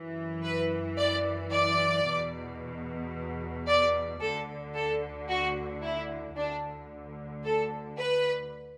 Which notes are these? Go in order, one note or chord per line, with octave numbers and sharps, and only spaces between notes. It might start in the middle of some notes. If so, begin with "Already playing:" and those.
Already playing: F#2 E3
B4
D5
D5
E2 B2
D5
D2 D3 A4
A4
F#4
E4
D2 D3 D4
A4
B4